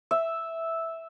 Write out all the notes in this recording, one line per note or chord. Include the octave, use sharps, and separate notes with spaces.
E5